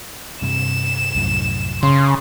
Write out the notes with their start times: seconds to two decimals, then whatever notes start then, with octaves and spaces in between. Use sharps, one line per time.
0.42 G2 C3 E7
1.15 C2 F#2 A2
1.83 C#3 C6